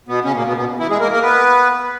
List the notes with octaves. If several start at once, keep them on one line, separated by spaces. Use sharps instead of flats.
B2 B3
C#3 C#4
A#2 A#3
B2 B3
B2 B3
E3 E4
G#3 G#4
A#3 A#4
A#3 A#4
B3 B4